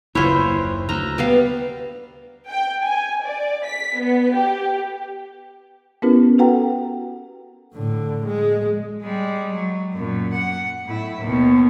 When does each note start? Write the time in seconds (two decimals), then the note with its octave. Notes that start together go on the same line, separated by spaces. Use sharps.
0.15 F#1 D#2 E4 F4 C5 C#5
0.89 D2 A#5
1.18 G3 B3 F5
2.48 G5
2.83 G#5
3.22 D5
3.64 B6
3.98 B3
4.34 G4
6.02 B3 C#4 E4 G4 A#4 B4
6.38 F#4 A4 B4 F#5 G5 A#5
7.74 A2 D3
8.27 G#3
9.02 G3 G#3
9.52 F#3
9.93 F#2 A#2
10.33 F#5
10.85 A2 E4
11.21 D#2 B2